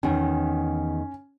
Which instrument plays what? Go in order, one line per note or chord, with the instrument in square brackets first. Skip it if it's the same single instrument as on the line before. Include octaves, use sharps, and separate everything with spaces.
[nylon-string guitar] E2 D#3 [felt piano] C#4